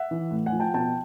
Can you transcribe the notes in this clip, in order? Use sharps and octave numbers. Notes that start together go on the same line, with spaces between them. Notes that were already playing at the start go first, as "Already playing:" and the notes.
Already playing: E5 F#5
E3
A2
F#5 G#5
F3
G5 A5
B2 G5 A5